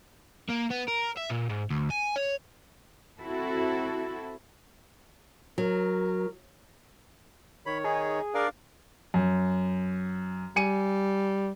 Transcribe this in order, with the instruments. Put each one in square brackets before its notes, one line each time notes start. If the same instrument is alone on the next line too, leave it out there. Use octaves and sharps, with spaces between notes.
[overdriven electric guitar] A#3
B3
A#4
E5
A#2
G#2
D2
G#5
C#5
[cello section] C4 E4 F#4 A4
[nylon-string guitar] F#3 [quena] A#4
[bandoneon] D#3 C#5 [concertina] B5
[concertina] D#4 [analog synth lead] G#4
[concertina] D4 F5 [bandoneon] A#4 D5
[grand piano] F#2
[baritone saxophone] G3 [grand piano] G#5 C#7 D#7